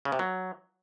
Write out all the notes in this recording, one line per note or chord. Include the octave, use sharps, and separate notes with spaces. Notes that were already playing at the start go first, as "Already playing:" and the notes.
C#3
C3
F#3